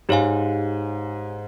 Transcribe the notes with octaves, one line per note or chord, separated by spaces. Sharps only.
G#2 G4 C#5 F5 G#5